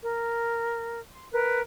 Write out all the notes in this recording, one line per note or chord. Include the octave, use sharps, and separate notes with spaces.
A#4
C6
A#4 B4